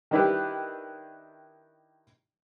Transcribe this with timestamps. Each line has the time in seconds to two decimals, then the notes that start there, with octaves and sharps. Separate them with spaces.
0.11 D#3 D4 E4 G4 B4